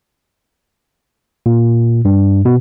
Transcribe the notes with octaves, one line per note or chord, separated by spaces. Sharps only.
A#2
G2
B2